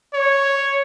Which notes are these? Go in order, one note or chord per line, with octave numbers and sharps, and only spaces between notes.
C#5